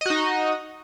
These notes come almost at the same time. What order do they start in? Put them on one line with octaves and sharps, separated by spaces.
D#5 F#4 D#4